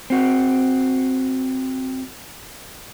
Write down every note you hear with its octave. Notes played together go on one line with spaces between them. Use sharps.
C4 F#4